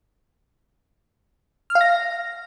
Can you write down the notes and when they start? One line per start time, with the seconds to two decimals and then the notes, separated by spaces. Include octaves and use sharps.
1.70 F6
1.75 F5
1.81 A#6